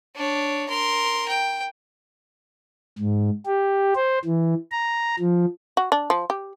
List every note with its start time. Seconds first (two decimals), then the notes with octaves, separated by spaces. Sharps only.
0.16 D4 C#5
0.69 A#4 C6
1.28 G5
2.98 G#2
3.46 G4
3.96 C5
4.25 E3
4.72 A#5
5.19 F3
5.77 F#4
5.92 D4
6.10 F3
6.30 G4